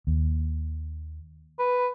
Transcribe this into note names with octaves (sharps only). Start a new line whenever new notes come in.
D#2
B4